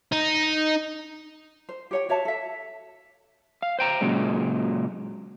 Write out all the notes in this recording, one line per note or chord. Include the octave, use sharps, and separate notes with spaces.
D#4
C5
G4 C#5 G5
F#4 C#5 E5 A5
A4 E5
F5
C5 G5 A#5
A#2 C#3 F#3 G#3